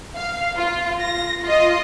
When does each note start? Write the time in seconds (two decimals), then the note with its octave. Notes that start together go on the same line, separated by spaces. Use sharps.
0.15 F5
0.56 F4
1.01 A#6
1.43 F4 D#5